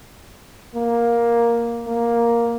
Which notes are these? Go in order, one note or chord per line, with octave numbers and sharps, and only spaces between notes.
A#3
A#3